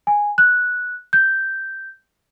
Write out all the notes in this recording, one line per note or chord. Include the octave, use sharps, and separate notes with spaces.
G#5
F#6
G6